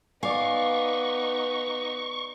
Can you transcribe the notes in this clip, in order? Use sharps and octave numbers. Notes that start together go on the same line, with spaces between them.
B3 D#4 D5 F5 G#5 C#6